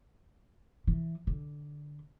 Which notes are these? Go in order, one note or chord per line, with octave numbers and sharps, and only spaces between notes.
E3
D3